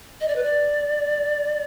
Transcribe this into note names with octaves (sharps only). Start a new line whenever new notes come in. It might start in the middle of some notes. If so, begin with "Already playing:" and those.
D#5
D5
B4
D5